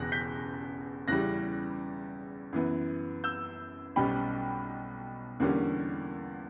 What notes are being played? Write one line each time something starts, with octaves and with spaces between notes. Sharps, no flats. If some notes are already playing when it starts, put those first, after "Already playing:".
Already playing: E1 E2 C#3 F#6 A#6
G6 B6
E2 C#3 E3 G3 C#4 F#6 A#6
F#2 E3 B3
E6 G6
B1 B2 G3 C#4 G5 B5
E2 D3 G3 A#3 C#4